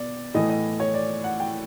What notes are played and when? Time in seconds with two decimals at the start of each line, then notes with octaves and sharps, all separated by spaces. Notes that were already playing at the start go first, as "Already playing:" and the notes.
Already playing: B2 B3 D5
0.34 A2 E3 A3 D#5
0.50 D#5
0.80 C#5
0.94 D5
1.24 F#5
1.40 G5